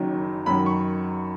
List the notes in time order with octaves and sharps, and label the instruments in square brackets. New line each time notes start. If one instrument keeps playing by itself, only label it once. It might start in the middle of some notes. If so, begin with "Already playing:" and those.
Already playing: [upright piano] F#1 F#2 D#3 F#3
F#2 D#3 F#3 B5
C#6